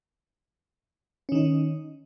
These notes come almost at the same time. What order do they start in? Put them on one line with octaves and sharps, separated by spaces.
C#4 D#3 D#4